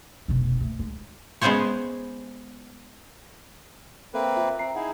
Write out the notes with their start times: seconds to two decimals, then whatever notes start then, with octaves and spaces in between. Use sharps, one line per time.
0.28 F1 B2
0.60 D2 A3
0.79 G#3
1.41 G#3 B3 C#4 G#4 C5 C#5
4.14 A#3 C4 A4 B4 E5
4.36 F4 E5
4.59 C4 E5 A#5 C7
4.75 D#4 E4 G#4 F#5